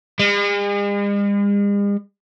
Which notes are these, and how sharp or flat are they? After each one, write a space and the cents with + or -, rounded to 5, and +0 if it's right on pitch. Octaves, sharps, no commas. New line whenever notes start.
G#3 -45